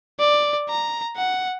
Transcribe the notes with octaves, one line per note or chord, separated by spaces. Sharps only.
D5
A#5
F#5